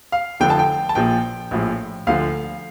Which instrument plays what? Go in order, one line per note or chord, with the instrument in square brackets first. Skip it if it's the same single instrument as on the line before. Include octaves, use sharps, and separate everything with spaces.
[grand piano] F5
F1 F2 D3 F3 G5
A5
G5
A5
A#1 A#2 F3 G5
A#1 A2 F3
D2 D3 F3 F5